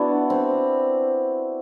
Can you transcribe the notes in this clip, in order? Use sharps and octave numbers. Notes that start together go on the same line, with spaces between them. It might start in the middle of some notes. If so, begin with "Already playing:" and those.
Already playing: B3 D4 E4 F#4
C4